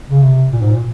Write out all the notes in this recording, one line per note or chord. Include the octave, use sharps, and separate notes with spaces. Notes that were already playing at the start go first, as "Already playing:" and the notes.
C#3
C3
A#2
G#2
A#2